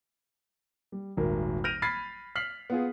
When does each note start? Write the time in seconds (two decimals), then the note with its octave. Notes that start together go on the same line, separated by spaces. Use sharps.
0.92 G3
1.17 D#1 G#1 A#4
1.64 F6 G6 A#6 D7 D#7 F7
1.82 B5 F6 G#6 A6 B6 C7
2.36 F6 B6 C7 F#7
2.70 B3 F4 G#4